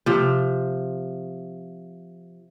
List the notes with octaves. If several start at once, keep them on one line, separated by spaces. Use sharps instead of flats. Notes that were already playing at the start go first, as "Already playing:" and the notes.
C3 F3